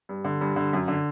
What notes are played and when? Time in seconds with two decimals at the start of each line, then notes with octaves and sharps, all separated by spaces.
0.09 G2
0.25 D3
0.41 G2
0.56 D3
0.73 F#2
0.88 D3